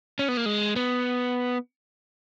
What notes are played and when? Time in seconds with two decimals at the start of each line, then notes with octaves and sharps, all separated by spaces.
0.19 C#4
0.28 B3
0.37 A#3
0.46 G#3
0.76 B3